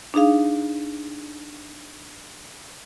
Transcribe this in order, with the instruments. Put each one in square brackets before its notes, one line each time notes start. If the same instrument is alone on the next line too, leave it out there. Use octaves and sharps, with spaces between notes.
[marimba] D4 D#4 G#4 F5